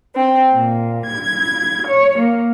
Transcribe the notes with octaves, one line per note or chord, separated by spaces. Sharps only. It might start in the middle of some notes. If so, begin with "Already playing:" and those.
C4
A#2
G#6
C#5
A#3